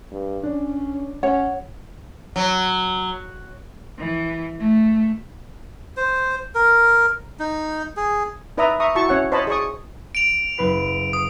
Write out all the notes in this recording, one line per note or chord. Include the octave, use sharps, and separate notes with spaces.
G2
C#4 D4
C#4 C#5 F#5
F#3
E3
A3
C5
A#4
D#4
G#4
D#4 B4 D5 E5 A#5 D#6
E5 A#5 C#6 D#6
E4 F#4 A5 C#6
C#4 C#5 F#5
C5 C#5 D#5 A5 B5
G#4 D5 C#6 D#6
D7 F7
F#1 B4 C7
D#6